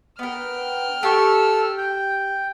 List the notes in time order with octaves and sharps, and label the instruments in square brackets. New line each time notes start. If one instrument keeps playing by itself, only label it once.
[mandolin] B3 A#4 [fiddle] G5 F6
[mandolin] G4 C#6 [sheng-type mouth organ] A4 E6
[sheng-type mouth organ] G5